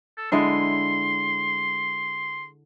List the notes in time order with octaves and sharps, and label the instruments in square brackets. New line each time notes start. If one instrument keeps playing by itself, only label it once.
[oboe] A4
[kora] D3 G#3 E4 [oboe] C6